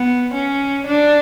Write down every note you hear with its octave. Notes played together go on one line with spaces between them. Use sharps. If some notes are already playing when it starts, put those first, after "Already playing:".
Already playing: B3
C#4
D4